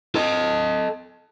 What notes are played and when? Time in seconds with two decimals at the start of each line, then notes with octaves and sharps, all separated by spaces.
0.15 A4 D#5